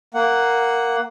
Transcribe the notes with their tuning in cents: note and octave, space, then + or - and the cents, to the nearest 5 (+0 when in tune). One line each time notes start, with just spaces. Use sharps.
A#3 +0 F#5 +5